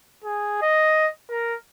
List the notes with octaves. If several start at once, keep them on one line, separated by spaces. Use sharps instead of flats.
G#4
D#5
A#4